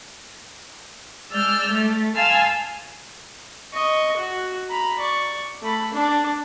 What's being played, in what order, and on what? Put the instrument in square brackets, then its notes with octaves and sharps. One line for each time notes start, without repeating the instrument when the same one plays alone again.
[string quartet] G#3 D5 E6 F6 G6
A3
F5 G#5 A5 C6 E6 F6
[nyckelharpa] D#5 C#6
F#4
A#5 B5
D5 C#6
A3 B5
D4